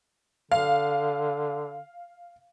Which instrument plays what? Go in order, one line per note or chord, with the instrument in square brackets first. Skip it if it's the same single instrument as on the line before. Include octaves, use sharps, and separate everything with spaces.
[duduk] D3 [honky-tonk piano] F5